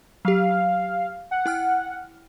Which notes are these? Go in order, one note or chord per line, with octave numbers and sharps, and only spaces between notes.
F#3 G4 F5
F#5
E4 G5 F6